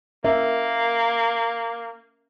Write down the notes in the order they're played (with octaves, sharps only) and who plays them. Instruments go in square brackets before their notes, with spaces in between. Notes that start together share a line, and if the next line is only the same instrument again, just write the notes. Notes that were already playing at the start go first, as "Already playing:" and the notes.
[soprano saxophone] A#3 [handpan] C#4 A#4 E5